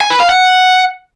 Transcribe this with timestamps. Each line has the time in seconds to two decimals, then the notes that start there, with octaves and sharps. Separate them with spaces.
0.01 G#5
0.10 B4
0.20 F5
0.29 F#5